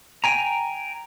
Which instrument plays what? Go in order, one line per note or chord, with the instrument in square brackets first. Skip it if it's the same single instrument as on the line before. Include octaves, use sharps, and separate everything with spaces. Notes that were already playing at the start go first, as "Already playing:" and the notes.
[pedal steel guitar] G5 G#5 A#5